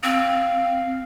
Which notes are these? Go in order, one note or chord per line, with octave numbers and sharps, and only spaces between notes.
C4 F5